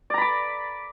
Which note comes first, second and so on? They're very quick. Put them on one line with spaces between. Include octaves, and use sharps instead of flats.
D5 A#5 B5 D6